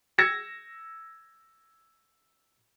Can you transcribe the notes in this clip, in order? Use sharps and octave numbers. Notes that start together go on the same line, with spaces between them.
E6 G#6 A#6 C#7 E7